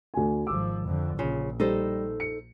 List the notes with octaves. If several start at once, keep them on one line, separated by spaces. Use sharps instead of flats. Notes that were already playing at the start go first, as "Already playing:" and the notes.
D2 G#5
G#1 F3 D6 E6
F2 D3
A#1 C#3 F4
G3 D#4 A4 C5
C#7